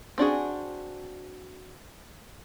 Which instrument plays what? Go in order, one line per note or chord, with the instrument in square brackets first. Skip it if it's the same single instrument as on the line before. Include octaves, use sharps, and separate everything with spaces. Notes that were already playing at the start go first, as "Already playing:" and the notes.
[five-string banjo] C4 D4 F#4 G#4